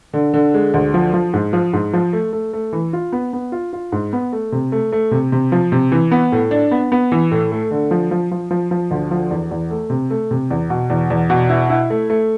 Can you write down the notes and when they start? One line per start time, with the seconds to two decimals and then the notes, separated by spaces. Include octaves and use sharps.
0.14 D3
0.34 D3
0.54 G#3
0.74 D2
0.94 F3
1.14 F3
1.34 G#2
1.53 F3
1.73 G#2
1.93 F3
2.13 A3
2.33 A3
2.53 A3
2.73 E3
2.93 F4
3.12 B3
3.33 B3
3.52 F4
3.73 F4
3.92 G#2
4.13 B3
4.33 A3
4.52 C3
4.72 A3
4.92 A3
5.11 C3
5.32 C3
5.52 F3
5.72 C3
5.92 E3
6.11 B3
6.32 A2
6.51 D4
6.71 B3
6.92 B3
7.12 E3
7.31 A2
7.52 A3
7.71 D3
7.91 F3
8.11 F3
8.31 F3
8.51 F3
8.71 F3
8.91 D2
9.11 F3
9.31 E2
9.51 E2
9.70 A3
9.90 C3
10.10 A3
10.31 C3
10.51 E2
10.70 B2
10.90 E2
11.10 E2
11.30 B2
11.49 E4
11.69 E4
11.90 A3
12.10 A3